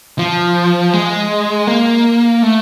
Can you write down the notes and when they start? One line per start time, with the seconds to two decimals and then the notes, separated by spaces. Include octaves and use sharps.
0.19 F3
0.94 G#3
1.67 A#3
2.43 A3